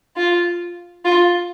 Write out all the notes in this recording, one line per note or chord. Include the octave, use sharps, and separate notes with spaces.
F4
F4